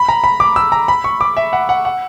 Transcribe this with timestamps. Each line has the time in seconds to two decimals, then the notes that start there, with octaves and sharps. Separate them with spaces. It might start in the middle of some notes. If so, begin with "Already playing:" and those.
Already playing: B5
0.09 A#5
0.24 B5
0.40 D6
0.56 E6
0.72 A#5
0.88 B5
1.04 C#6
1.21 D6
1.37 E5
1.53 F#5
1.69 F#5
1.85 F#5